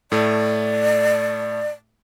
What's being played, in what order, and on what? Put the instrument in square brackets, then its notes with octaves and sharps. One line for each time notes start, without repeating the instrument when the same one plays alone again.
[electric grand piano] A2 A3 [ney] D5